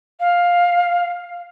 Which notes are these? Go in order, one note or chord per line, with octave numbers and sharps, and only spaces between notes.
F5